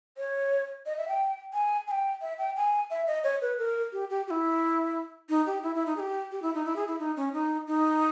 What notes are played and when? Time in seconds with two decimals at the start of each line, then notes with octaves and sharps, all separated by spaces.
0.18 C#5
0.86 D#5
0.98 E5
1.08 G5
1.54 G#5
1.88 G#5
1.91 G5
2.22 E5
2.39 G5
2.57 G#5
2.90 E5
3.07 D#5
3.24 C#5
3.42 B4
3.58 A#4
3.93 G4
4.10 G4
4.27 G4
4.31 E4
5.30 D#4
5.47 G4
5.63 E4
5.75 E4
5.86 D#4
5.97 G#4
6.00 G4
6.32 G4
6.42 E4
6.55 D#4
6.65 E4
6.76 G#4
6.88 E4
6.99 D#4
7.17 C#4
7.33 D#4
7.67 D#4